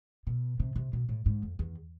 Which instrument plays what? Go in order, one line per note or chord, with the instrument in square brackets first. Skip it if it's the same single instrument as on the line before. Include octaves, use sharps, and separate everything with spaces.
[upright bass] B2
C3
C3
B2
A2
G#2
F2
E2